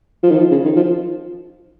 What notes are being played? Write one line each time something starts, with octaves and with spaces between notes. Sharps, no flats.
F3
D#3
F3
C#3
D#3
F3